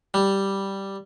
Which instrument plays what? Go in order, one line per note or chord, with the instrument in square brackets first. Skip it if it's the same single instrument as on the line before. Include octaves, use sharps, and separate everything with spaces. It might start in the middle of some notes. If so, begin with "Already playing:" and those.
[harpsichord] G3